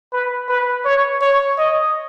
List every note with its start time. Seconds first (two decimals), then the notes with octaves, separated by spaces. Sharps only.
0.12 B4
0.49 B4
0.85 C#5
1.22 C#5
1.58 D#5